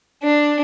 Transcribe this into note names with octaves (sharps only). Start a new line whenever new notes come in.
D4